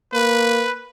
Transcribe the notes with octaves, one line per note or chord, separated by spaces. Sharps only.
A#3 B4